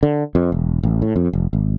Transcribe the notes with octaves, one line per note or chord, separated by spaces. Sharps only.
D3
F2
E1
A1
A2
F2
F1
G#1